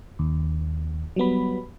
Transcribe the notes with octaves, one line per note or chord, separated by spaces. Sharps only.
D#2
F#3 G3 B3 B5